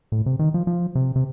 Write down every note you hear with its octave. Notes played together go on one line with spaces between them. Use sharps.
A2
C3
D#3
F3
F3
C3
C3